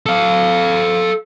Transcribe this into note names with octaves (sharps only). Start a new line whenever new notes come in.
A4 F5